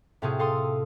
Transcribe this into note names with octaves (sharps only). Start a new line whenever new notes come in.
A2 C3 C4 F4 F#4 G#4
A4 F5 C6 D#6